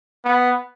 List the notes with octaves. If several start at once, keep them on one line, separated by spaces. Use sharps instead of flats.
B3